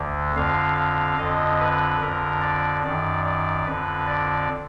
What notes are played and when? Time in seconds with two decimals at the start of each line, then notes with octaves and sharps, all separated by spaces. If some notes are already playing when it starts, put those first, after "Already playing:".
Already playing: D2 D3
0.35 F2 D3 F5
0.77 F5
1.17 F2 D3 D#5
1.59 B4
2.00 F2 D3 A#4
2.41 D5
2.83 F#2 D#3 D5
3.24 D5
3.65 F2 D3 B4
4.06 D5